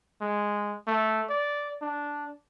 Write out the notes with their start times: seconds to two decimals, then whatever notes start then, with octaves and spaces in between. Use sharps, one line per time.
0.21 G#3
0.87 A3
1.29 D5
1.81 D4